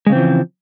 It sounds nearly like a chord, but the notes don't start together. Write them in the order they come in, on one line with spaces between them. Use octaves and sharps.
G#3 C#3 C4 E3 F3